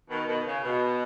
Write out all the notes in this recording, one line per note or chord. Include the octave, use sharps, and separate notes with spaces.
B2 D#3
B2 D#3
C#3
B2